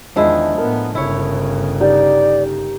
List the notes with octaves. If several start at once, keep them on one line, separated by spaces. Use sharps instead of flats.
E2 D#3 F3 G#3 D4 E4
A2 B3 A#4
G1 C#3 E4 C#5
D#4 G4 D5